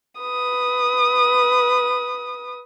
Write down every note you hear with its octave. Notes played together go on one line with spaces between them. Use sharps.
B4 D#6